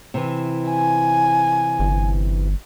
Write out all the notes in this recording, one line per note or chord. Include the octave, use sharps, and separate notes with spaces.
C3 E3
G#5
G1